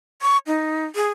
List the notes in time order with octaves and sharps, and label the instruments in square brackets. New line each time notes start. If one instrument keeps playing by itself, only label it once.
[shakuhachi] C#6
D#4
G#4